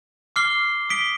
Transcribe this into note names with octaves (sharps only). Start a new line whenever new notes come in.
D6 F6 C7 G7
D#6 B6 D7 G7